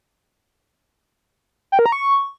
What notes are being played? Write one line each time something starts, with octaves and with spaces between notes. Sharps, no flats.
G5
A#4
A#5
C#6